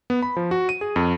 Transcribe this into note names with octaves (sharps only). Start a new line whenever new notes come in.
B3
B5
F3
F#4
D#7
G#4
F2